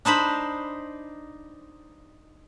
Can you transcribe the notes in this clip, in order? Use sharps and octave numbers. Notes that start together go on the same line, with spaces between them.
D4 D#4 C5 B5